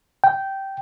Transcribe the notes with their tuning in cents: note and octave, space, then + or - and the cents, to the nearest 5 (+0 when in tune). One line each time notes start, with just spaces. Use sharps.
G5 -10